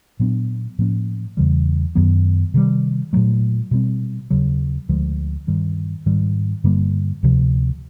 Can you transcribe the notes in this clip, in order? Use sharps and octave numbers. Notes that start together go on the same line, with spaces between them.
A#2 F#3 B3 D4
A2 F3 A#3 C#4
E2 C#3 E3 G3
F#2 D#3 F#3 B3
C3 D#3 G3
A#2 F#3 A3
B2 G3 C4
D#2 C#3 F#3
D2 D3 F3 G#3
G2 D#3 G3
G#2 D#3 G3
G2 D3 G3 A#3
D2 C3 F3